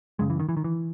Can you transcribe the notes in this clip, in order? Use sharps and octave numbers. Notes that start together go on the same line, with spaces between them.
F#2 C#3 G#3
E3
D#3
E3
D#3
E3